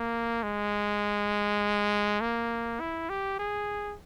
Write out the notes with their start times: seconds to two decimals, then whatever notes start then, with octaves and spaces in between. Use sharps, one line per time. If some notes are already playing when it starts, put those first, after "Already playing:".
Already playing: A#3
0.43 G#3
2.21 A#3
2.80 E4
3.10 G4
3.39 G#4